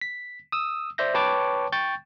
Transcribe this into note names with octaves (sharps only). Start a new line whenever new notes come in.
B6
D#6 E6
C5 D5 E5 G6 A#6
B4 C#5 G5 A5 C#6 D6
G5 C#6 G6 A6